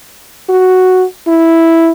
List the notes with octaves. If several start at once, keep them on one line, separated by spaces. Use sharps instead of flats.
F#4
E4